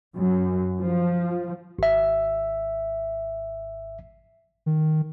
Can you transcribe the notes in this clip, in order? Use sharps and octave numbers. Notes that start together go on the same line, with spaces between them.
F#2
F3
G#1 E5
D#3